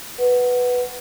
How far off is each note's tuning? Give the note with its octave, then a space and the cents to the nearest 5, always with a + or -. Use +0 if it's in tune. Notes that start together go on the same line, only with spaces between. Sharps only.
B4 +0 F#5 +0